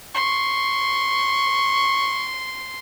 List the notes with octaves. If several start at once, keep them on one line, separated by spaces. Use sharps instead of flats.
C6 C#6